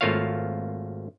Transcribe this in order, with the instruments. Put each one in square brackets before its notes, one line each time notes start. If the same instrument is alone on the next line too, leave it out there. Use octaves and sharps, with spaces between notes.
[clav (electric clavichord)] G#1 A3 A#3 F4 C#5 F5